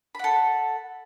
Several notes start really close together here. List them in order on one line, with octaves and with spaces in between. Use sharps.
B5 F#5 A4